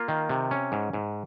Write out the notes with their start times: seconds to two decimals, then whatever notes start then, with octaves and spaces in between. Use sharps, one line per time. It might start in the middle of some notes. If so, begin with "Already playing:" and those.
Already playing: A#3 F4
0.08 D#3
0.29 C3
0.51 C#4
0.72 G#2
0.93 G#2